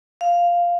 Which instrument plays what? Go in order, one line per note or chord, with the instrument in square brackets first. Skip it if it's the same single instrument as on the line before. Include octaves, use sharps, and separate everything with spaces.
[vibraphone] F5